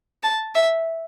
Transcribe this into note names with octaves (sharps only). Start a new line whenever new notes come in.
A5
E5